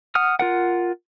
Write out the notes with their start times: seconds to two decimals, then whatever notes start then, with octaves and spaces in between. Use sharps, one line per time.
0.15 F#5 D#6 F6
0.39 F4 A#4 F#5